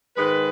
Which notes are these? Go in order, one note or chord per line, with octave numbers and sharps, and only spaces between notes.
G#2 D#3 G#3 B4